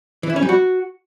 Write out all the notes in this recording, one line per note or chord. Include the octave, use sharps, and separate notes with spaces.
E3
E4
C#4
G3
F#4